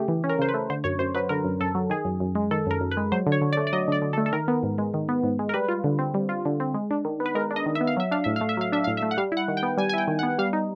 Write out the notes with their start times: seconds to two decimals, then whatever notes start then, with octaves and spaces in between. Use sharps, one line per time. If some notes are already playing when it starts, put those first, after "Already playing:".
Already playing: C#3 A3 G4 G#4
0.08 E3
0.24 C#4
0.29 A#4
0.39 C#3 C5
0.49 B4
0.54 A3
0.70 D3 C5
0.84 F#2 C#5
0.99 F#2 C5
1.15 F#3 B4
1.29 D3 A#4
1.44 F#2
1.60 F#2 A4
1.75 F#3
1.90 D#3 G#4
2.05 F#2
2.20 F#2
2.35 G#3
2.51 D#3 A4
2.67 F#2 A#4
2.81 F#2
2.91 B4
2.97 G#3
3.12 F#3 C5
3.27 D3
3.32 C#5
3.41 D3
3.53 D5
3.57 A3
3.67 D5
3.73 F#3 D#5
3.88 D3 D5
4.02 D3
4.13 A4
4.17 A3
4.26 A4
4.33 D#3 A#4
4.48 B3
4.63 G#2
4.78 G#3
4.94 D#3
5.09 B3
5.24 G#2
5.39 G#3
5.49 A#4
5.54 G3 B4
5.69 F4
5.84 D3
5.99 C4
6.14 G3
6.29 F4
6.45 D3
6.60 C4
6.74 G#3
6.91 D4
7.05 D#3
7.20 B3
7.26 B4
7.35 G#3 A#4
7.51 D4
7.56 D#5
7.66 D#3
7.75 E5
7.81 B3
7.87 F5
7.97 F#3 E5
8.12 D4 F5
8.24 A2 E5
8.36 A3 F5
8.49 E5
8.57 F#3 F5
8.72 D4 E5
8.84 A2 F5
8.97 E5
9.02 A3
9.11 F#5
9.17 G3 F5
9.32 E4
9.37 F#5
9.48 D#3
9.57 G5
9.63 B3
9.78 G3 G#5
9.89 G#5
9.94 E4 G5
10.08 D#3
10.19 F#5
10.23 B3
10.39 G3 F5
10.53 D#4